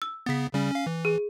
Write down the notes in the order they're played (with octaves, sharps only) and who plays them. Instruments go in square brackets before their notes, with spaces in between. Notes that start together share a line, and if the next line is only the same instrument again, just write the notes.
[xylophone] E6
[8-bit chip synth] C#3 B3 [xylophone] A6 B6
[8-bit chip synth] C#3 G3 C#4
C#4 F5
E3
[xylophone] G#4